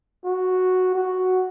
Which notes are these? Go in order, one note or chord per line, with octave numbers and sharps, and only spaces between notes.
F#4
F#4